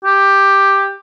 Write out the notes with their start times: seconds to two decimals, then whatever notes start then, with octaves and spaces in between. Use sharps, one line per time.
0.05 G4